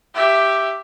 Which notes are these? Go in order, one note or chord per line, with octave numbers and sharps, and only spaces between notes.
G4 E5